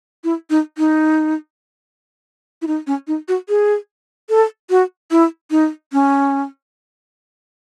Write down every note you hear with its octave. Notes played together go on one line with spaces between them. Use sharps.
E4
D#4
D#4
E4
D#4
C#4
D#4
F#4
G#4
A4
F#4
E4
D#4
C#4